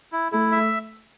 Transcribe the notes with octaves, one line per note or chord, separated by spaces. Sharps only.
E4
A3 E4
E5